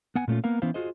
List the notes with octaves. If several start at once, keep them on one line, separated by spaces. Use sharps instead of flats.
B3 F#5 G#5
A#2 A3 C#4 F4
A#3 B3 A#4 F5
E3 B3 C#4 E4 C5 F5
F4 F#4 G#4 C5 D#5